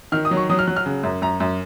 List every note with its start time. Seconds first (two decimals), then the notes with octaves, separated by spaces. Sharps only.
0.12 D#3 F6
0.25 D#6
0.31 F#3
0.37 C#6
0.50 F#3 D#6
0.59 F6
0.67 F#3 F#6
0.76 F6
0.86 C#3
1.03 F#2
1.22 F#2 A#5
1.40 F#2